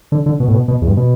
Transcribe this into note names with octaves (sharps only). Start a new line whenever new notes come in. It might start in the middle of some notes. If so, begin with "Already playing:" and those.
D3
D3
B2
A2
B2
B2
E2
G2
B2